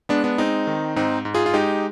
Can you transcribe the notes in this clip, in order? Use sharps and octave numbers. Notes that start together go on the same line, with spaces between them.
G#3 B3 D4
B3 D4
G#3 C4 D#4
D#3
G#2 C4 D#4
G#2
F4 G#4
F4
G#3 D#4 G4